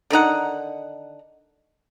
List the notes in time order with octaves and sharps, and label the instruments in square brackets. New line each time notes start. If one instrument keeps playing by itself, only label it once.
[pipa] D3 D#3 D#4 F#5